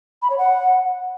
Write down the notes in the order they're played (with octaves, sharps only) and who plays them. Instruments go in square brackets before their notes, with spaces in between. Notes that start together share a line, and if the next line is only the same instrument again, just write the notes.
[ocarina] B5
C#5
F#5